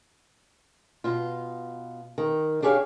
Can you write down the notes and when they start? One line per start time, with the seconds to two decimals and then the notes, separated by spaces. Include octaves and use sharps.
1.04 B2 F4
2.18 D#3
2.62 D4 G4 G#4 C#5 F5